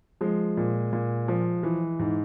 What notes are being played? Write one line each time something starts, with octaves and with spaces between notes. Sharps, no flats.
F3 G#3
A#2
A#2
F3
E3
G#2